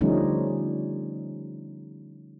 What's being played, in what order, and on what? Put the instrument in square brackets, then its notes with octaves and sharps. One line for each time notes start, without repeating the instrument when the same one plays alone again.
[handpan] D3 F3 G3 A3 C#4 D#4